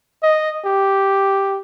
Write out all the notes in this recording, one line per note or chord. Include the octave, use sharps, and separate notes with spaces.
D#5
G4